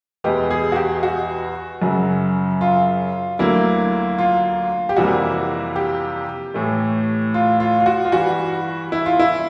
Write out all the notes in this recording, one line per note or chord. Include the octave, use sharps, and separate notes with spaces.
E2 B2 G#3 B3 G4
G#4
F#4
G4
F#4
F#2 C#3 F#3
F4
D2 D3 F#3 A#3 E4
F4
G4
F2 C3 E3 G3 A#3 F#4
G4
A2 E3 A3
F4
F4
F4
F#4
F4
G2 E3 G3 F#4
E4
F4
E4